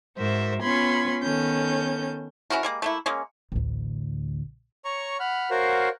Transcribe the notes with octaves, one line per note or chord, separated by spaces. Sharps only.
G#2 F#4 A#4 C5 E5
B3 C#4 F4 B5 C6 G#6
D#3 B3 C#4 A4 G6
C#4 E4 F#4 A#4
G3 G#3 A#3
A3 A#3 E4
G#3 A#3 C#4
A1 D2
C#5 A#5 C#6
F#5 B5 F6
F#4 A#4 C5 C#5 F5 F#5